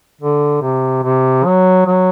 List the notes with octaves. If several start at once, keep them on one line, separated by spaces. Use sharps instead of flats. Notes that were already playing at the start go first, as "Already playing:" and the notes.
D3
C3
C3
F#3
F#3